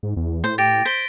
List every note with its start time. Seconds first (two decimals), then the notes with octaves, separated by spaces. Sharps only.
0.03 G#2
0.17 E2
0.44 A2 C5
0.58 G4 A6 A#6 D7
0.85 C5 B6 G7